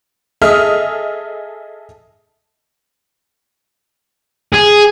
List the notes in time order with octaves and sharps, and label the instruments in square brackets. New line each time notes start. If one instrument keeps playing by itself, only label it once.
[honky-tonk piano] G#4 A4 D#5 E5 D#6 F6
[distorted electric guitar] G#4